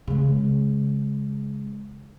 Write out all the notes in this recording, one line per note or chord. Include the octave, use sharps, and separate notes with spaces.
C#3 G#3